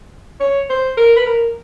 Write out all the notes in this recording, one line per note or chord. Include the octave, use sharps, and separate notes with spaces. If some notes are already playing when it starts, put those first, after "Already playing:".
C#5
C5
A#4
B4
A#4